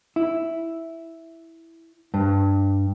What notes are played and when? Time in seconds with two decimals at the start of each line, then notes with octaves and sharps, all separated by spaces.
0.16 E4
2.14 G2